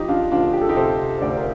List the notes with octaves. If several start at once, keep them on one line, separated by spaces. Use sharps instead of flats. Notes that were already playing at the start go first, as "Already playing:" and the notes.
Already playing: F3 D#4 G4
D4 F4
D2 D4 F4
G4
A4
D#4 G4
C3 A4 C5
D2 D5
C5
A#4